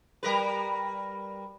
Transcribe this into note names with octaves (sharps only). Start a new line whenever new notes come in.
G3 A#4 B4